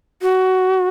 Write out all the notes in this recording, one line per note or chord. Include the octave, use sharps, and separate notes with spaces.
F#4